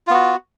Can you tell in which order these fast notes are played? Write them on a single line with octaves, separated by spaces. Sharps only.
F4 B3 F#4